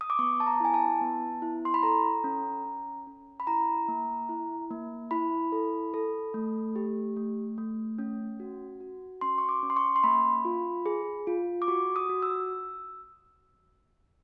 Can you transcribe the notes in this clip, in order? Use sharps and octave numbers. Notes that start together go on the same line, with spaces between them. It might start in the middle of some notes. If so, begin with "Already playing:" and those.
D#6
D6
B3 C#6
A5
A#5
E4 G#5
A5
B3
E4
C6
B5
A4 A#5
C#4
C#4
C#4
B5
E4 A#5
A#3
E4
A#3
E4 B5
A4
A4
A3
G4
A3
A3
C#4
F#4
F#4
C#4 C6
C#6
D6
C#4
C6
C#6
C6
A#3 B5
F4
G#4
F4
D6
F#4 C#6
D#6
F#4
E6